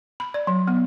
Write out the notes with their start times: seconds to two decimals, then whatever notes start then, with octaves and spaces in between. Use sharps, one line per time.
0.20 B5
0.34 D5
0.47 F#3
0.68 B3